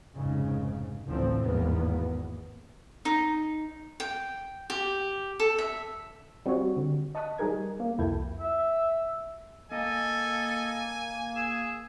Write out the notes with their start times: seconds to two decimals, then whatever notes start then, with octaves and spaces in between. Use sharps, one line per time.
0.14 F1 G#2 C#3
1.07 A1 D2 A2 F3 C4
1.41 G#1 E2 A#3 B3
3.05 D#4
4.00 G5
4.70 G4
5.40 A4
5.58 E5
6.46 G3 C4 F4 F#4 C#5
6.77 D3
7.15 D#5 A5 C#6 D#6 F#6 B6
7.38 G3 D#4 G#4 A#4 G#6
7.80 A#3
7.98 C2 F2 E4 A4 G5 G#6
8.40 E5
9.71 A#3 A4 D#5 G#5
11.36 G#4 E6